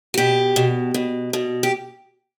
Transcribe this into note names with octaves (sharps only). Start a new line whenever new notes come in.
F#4
B2 G4
B2
B2
B2
G4